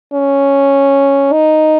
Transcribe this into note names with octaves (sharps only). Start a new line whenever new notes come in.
C#4
D#4